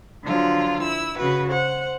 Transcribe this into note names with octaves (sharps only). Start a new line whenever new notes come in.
D3 F3 F#3 F4
E4 E6
C#3 F#4 B4
C5 F#5